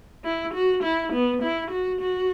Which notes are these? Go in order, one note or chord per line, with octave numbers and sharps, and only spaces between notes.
E4
F#4
E4
B3
E4
F#4
F#4